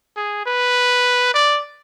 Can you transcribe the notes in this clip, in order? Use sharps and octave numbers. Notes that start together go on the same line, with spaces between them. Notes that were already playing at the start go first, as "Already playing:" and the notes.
G#4
B4
D5